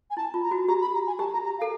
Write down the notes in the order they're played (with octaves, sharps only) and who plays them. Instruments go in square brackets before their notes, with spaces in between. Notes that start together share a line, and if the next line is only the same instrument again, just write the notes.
[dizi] G#5
[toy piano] E4 [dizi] A5
[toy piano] F4
[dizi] A#5
[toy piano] F#4
[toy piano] G4 [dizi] A#5
[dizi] B5
A#5
G#5
[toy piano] G4 [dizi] A5
[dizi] A#5
A#5
F5
[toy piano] A4